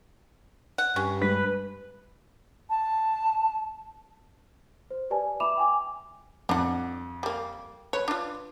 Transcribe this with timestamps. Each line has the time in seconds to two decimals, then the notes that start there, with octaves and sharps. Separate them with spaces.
0.78 F#5
0.96 G2 C#4
1.21 G3 G#3 D4 B4
2.70 A5
4.91 C5
5.10 G4 B4 D5 G#5 A5
5.40 E5 B5 D6 E7 F7
5.58 G5 G#5 D6
6.49 F2 D4 F#5
7.23 G3 A#3
7.93 B4 C#5
8.08 D4 F4